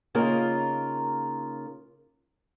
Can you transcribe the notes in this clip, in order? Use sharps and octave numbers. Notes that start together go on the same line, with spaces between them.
C#3 A#3 D#4 F4 A#4